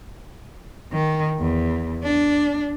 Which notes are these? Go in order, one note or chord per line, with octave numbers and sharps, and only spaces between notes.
D#3
E2
D4